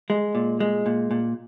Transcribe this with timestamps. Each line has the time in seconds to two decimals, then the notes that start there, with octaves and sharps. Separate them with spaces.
0.10 G#3
0.35 A#2
0.60 G#3
0.86 A#2
1.11 A#2